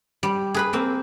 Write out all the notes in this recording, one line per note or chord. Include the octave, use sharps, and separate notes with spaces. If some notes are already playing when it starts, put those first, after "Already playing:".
G3
G#4 B4 B5
A#3 C4